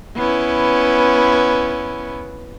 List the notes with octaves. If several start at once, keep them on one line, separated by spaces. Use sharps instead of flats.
B3 C#4 E4